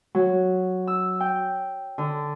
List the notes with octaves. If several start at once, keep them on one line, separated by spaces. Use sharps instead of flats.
F#3
E6
G5
D3